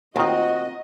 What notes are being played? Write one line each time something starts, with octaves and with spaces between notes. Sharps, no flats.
D#2 D#3 C4 F4 F#4 D#5